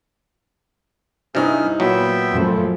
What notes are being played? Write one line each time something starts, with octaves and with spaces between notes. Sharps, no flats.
G2 C3 D#4 E4 G#4 F6
A#2 F#3 B3 E5 G5
F#2 F3 A3